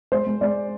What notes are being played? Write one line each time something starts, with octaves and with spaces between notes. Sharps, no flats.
G#3 C5
G#3
G#3 D5